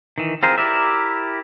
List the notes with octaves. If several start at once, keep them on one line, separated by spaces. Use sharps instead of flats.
D#3 E3
C4 F4 G#4 A#4 C5
E4 G4 A#4 D5 E5